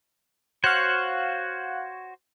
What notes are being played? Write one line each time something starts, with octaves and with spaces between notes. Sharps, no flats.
F#4 C5 C#5 F5 F#5 F#6